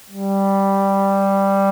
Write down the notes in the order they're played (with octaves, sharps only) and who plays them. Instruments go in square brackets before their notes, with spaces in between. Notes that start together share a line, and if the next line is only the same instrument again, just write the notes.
[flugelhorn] G3